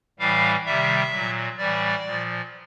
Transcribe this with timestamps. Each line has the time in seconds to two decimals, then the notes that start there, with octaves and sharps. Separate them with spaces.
0.19 A2 E3 G3 F5
0.66 C3 D#3 G3 E5
1.12 A#2 F#3
1.58 A2 E3 G3 D5
2.04 A#2 F3